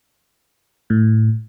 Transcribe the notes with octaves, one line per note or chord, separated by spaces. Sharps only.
A2